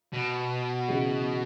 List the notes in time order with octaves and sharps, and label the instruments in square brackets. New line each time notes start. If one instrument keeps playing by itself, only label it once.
[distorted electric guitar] B2
[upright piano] C#3 E3 G#3